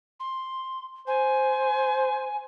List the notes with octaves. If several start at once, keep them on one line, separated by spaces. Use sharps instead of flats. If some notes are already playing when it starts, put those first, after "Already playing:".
C6
C5 G#5